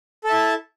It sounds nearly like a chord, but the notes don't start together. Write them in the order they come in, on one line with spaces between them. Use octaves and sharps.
A4 A5 E5 E4